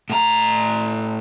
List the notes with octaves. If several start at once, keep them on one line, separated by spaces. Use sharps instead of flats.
A2 A#5